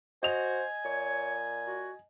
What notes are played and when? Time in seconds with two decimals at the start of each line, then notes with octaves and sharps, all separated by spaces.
0.23 F#4 C5 D#5 G#5 F7
0.85 A#2 C#5
1.67 F#4